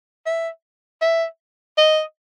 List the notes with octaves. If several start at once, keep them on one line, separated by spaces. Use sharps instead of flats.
E5
E5
D#5